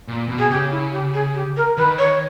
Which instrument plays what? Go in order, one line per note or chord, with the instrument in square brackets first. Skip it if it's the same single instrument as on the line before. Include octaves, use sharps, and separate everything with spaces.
[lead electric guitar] A#2
B2
[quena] G#4
[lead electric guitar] C#3 [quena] G4
[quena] E4
G4
G#4
G4
A#4
[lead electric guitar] D#3 [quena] B4
[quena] C#5